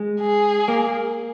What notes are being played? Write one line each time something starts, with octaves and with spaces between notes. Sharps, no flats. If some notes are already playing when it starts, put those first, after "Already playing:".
Already playing: G#3
G#4
A#3